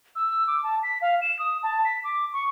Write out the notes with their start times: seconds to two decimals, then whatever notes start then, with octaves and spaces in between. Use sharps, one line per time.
0.15 E6
0.47 D6
0.63 A5
0.83 B6
1.02 F5
1.21 E7
1.39 D#6
1.63 A5
1.85 B6
2.04 D6
2.33 C#6